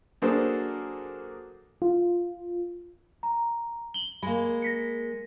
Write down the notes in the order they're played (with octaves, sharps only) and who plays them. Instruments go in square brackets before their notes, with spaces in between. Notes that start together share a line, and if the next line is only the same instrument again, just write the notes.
[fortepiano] F#3 A#3 D4 G#4 A4 C5
[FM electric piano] F4
[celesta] A#5
F#7 G7
[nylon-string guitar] G#3 A#3 [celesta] B5
[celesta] A#6 B6 C#7